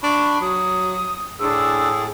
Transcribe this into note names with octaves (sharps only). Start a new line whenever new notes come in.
D4 B5 C#6
F#3 D#6
A2 D4 G#4 E6